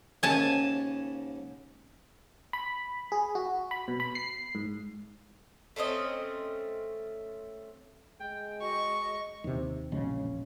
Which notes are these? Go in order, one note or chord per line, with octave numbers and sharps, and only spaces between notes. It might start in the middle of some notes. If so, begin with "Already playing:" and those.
D#2 G#2 C#3 G#5 A5
B5
G#4
F#4
B5
B2
B5
C7
G#2
A3 C4 C#4 D#5
G#3 G5
F#4 D#5 C#6
D#2 C3
E1 A#1 C#3 G#3